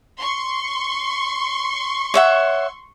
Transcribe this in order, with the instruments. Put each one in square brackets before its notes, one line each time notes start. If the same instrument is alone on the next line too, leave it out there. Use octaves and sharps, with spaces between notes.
[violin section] C6 C#6
[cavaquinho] C#5 E5 F#5